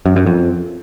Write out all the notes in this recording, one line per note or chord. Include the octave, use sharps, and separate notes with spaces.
F#2
F#2
F2